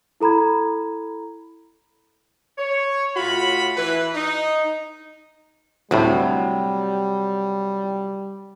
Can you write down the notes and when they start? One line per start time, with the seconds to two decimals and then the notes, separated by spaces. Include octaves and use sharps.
0.20 E4 A4 A#5 B5 G#6
2.57 C#5
3.17 A2 F4 F#4 B5
3.77 E3 B4
4.14 D#4
5.91 D2 A2 C3 F#3 G3